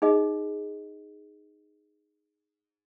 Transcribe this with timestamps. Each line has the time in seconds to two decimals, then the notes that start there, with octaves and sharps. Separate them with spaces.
0.02 D#4 G#4 D#5